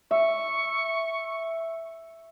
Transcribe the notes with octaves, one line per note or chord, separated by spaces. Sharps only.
E5 C#6